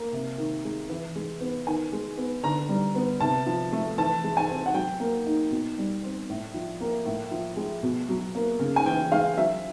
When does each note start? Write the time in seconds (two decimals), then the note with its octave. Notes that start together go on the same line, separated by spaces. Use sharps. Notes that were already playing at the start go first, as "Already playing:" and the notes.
Already playing: A#3
0.12 C3
0.38 D#3
0.65 G#3
0.89 E3
1.16 G#3
1.41 B3
1.66 D#3 G#5
1.93 G#3
2.17 B3
2.43 D3 A#5
2.69 G3
2.95 B3
3.20 C3 A5
3.46 F3
3.72 A3
3.98 E3 A5
4.24 G#3
4.37 G#5
4.49 C4
4.66 F#5
4.74 F#3 G5
5.00 A#3
5.26 D#4
5.51 B2
5.78 G3
6.03 C4
6.29 A2
6.54 F3
6.81 A#3
7.05 A2
7.31 F3
7.57 G#3
7.83 B2
8.09 F#3
8.35 A#3
8.59 C#3
8.76 G#5
8.86 E3 G5
9.12 G#3 F5
9.37 F#3 E5